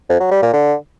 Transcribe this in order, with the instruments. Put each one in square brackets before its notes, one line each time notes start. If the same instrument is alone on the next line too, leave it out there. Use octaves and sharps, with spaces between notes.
[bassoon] F2
F#3
G3
A#2
D3